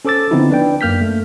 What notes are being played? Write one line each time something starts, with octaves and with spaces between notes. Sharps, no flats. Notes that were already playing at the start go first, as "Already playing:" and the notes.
C#4 A4 C5 D6 E6 A6
D3 F3 B3 C4 D#4 E4
D4 B4 D5 G5
F#2 A#3 F6 G6 B6
A3